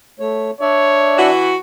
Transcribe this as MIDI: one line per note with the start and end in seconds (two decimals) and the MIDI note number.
0.20 0.51 57
0.20 0.51 73
0.61 1.30 62
0.61 1.22 73
0.61 1.30 74
0.61 1.30 76
1.18 1.56 52
1.18 1.56 66